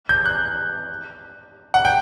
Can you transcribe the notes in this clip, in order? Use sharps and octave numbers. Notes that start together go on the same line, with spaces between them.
G6
F#6
F#5
G5